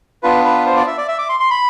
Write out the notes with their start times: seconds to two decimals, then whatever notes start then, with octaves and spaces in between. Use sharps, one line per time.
0.23 B3 D4 F4 B4
0.45 B4
0.66 C5
0.76 D5
0.87 E5
0.97 D5
1.08 E5
1.19 D6
1.29 C6
1.40 C6
1.50 B5